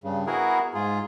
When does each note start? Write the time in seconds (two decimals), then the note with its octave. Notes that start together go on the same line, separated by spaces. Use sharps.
0.04 G2 C#3
0.27 B3 E4 F#4 G#4 A#4
0.74 G#2 F4 G#4